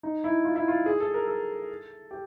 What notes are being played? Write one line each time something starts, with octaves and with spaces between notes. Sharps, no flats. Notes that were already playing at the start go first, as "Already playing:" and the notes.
D#4
E4
F4
E4
F4
G#4
A4
A#4
A4
G4